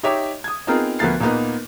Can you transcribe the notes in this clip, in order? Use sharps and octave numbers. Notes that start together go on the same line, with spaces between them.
D#4 G4 C#5 D#5 E5 D6
D#6 G#6
B3 C4 D#4 F4 G#4 A#4
D2 F3 B3 A#4 A6 C7
A#2 A#3 B3 D#4